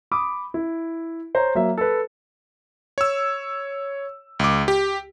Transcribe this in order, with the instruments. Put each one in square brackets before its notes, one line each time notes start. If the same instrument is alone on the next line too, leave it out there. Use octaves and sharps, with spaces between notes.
[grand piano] B5 D6 D#6
E4
C5 C#5 A#5
F#3 A#3 E5
A4 B4
[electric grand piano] C#5 E6
C#2 D6
G4